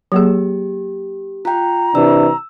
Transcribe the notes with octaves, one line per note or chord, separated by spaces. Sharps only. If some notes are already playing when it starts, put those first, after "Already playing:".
F#3 A#3 G4 G#4
F4 G5 A#5
C3 E3 D4 E6